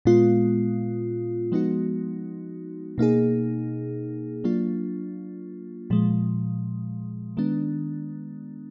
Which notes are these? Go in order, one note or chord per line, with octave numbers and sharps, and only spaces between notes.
A#2 G#3 B3 F4
F3 G#3 B3 D#4 F#4
B2 A#3 D#4 G#4
F#3 A#3 D4 F4
A#2 F3 G#3
D#3 G#3 B3 D4